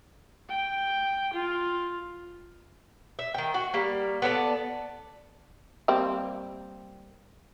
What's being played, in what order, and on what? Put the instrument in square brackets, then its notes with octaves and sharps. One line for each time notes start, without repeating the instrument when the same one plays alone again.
[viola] G5
F4
[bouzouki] E5
D#3 G5
F#4
G3 A#3
B3 A4 C#5 D5
[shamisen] G3 A#3 C4